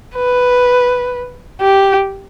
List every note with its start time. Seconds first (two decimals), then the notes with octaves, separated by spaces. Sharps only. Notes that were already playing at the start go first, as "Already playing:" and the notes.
0.16 B4
1.61 G4